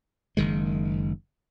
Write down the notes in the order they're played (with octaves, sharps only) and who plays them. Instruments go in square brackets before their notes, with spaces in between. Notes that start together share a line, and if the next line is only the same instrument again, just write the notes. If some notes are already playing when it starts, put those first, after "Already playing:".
[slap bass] F#1 D#3 G#3